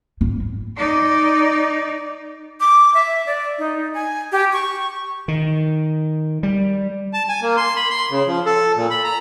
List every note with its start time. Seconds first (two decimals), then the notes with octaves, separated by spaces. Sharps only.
0.21 G#2
0.77 D#4 D5
2.60 D6
2.94 E5
3.26 D5
3.59 D#4
3.94 G#5
4.32 G4
4.53 C#6
5.28 D#3
6.43 G3
7.13 A5
7.29 G#5
7.42 A#3
7.57 C6
7.76 B5
7.90 C6
8.11 C#3
8.27 F3
8.46 A4
8.76 A#2
8.90 B5
9.04 A#5